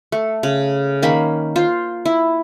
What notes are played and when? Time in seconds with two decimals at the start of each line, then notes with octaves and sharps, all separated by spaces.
0.12 A3
0.43 C#3
1.02 D#3 A#3 C#4 B5
1.56 F4 C5
2.05 E4